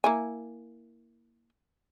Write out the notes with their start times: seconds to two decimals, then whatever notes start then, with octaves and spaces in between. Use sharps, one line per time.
0.04 A#3 E4 G#5